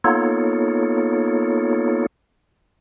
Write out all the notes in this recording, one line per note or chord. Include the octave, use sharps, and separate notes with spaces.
A#3 B3 D#4 F4 A4 C#5